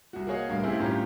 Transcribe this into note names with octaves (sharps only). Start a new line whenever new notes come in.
C2 F#4
A#3 F#4 G#4 C#5 D#5 F5
D1 C2 G2 A#4 F5
A3 C4 C#4 E4 G4 G#4
G1 A2 C#4 F4 G4 A#5